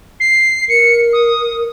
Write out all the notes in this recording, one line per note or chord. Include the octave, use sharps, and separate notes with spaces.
C7
A#4 C#7
D#6